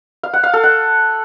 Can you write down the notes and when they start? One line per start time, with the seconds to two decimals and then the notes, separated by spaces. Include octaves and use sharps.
0.23 F5
0.33 F#5
0.43 F5
0.54 A4
0.64 F#5